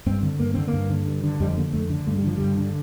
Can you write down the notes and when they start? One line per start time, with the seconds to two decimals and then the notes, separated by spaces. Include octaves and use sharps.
0.06 G2 C4
0.23 D3
0.39 G2 A#3
0.54 D3 C4
0.67 A#3
0.73 G2
0.90 D3
1.06 G2
1.24 D3
1.40 F2 G3
1.57 D3 A#3
1.73 F2 A3
1.90 D3
2.07 G2 A3
2.17 G3
2.24 D3 F3
2.37 G2 G3
2.57 D3